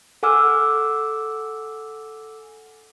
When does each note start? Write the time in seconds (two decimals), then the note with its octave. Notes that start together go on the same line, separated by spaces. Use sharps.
0.23 A4 F#5 G#5 D6 E6 F6